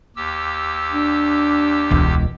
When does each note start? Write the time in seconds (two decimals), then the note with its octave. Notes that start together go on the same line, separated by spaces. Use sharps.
0.16 D#2 G4 E6
0.92 D4
1.91 E1 C#2